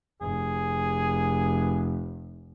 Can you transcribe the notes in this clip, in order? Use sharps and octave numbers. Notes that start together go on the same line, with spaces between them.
F1 G#4